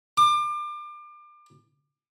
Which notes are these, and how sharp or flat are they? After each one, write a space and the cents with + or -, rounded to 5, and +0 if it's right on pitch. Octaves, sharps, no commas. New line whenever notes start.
D6 +30